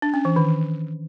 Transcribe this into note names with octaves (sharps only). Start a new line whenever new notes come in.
D4
C#4
E3
D#3